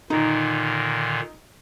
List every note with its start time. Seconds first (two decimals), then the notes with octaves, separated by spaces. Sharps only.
0.10 A#2 D3 D#3 D#4